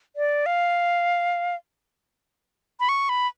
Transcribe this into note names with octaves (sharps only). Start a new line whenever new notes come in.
D5
F5
B5
C#6
B5